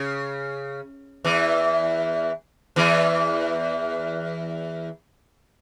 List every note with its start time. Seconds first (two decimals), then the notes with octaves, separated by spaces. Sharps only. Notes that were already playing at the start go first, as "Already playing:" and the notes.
Already playing: C#3
1.24 E2 E3
2.76 E2 E3